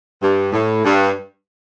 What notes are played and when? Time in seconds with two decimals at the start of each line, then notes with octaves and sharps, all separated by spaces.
0.22 G2
0.53 A2
0.84 G2